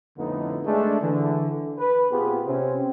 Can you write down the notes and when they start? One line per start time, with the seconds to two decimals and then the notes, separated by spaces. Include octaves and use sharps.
0.18 F2 A2 D3 B3 D#4 B4
0.65 G#3 A3 D4
1.01 D3 E3
1.78 B4
2.10 A#2 B3 C4 F4 G4 G#4
2.46 C3 C4 C#4